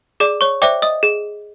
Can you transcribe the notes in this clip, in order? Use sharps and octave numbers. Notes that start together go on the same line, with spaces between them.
G#4 D5 D6
C#5 C#6
C5 D5 E5 G5 D6
D#5 D#6
G#4